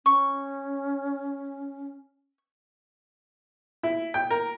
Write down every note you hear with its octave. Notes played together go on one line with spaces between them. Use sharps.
C#4 C#6
E4
G5
A#4